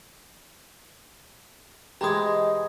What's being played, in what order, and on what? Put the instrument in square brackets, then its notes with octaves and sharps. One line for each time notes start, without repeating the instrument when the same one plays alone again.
[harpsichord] E3 G#3 C4 [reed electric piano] G4 G#6 [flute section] D#5 [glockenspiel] A#5 D#6